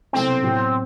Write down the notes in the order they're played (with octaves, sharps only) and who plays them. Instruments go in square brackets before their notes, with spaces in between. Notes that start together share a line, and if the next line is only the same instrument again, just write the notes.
[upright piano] C2 B2 F#3 A3 [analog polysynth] C4
[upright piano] A2 F#3 B3